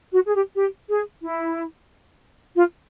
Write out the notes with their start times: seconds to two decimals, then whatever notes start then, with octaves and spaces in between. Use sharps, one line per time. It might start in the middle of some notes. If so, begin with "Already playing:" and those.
0.12 F#4
0.26 G#4
0.34 G4
0.55 G4
0.89 G#4
1.23 E4
2.55 F4